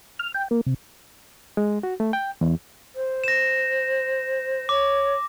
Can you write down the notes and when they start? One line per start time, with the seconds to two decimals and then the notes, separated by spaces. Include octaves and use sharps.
0.19 F6
0.34 G5
0.51 A#3
0.66 C3
1.57 G#3
1.83 F#4
2.00 A3
2.13 G5
2.41 E2
2.95 C5
3.24 A#6 E7
4.69 C#5 D6